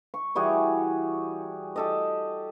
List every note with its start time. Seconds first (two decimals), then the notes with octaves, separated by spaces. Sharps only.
0.14 C#6
0.35 E3 G3 F#4 G#4
1.76 G4 A4 D#5